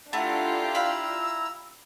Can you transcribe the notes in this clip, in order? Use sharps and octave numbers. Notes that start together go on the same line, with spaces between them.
A3 D4 E4 F4 G4 F#5 A#5
F5 B5 E6